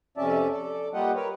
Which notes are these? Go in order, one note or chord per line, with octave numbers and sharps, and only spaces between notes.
F2 C3 C#4 D5 E5 A5
A4 D5
G3 A#3 F4 G4 D#5 F#5
A#4 B4 C#5